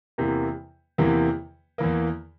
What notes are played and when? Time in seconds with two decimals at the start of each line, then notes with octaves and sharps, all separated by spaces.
0.18 E2 C3 E3 A#3
0.98 E2 C3 E3 A#3
1.78 E2 E3 A#3